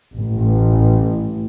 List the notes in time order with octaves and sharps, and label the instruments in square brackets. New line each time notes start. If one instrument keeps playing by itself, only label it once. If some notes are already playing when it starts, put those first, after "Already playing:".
[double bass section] A1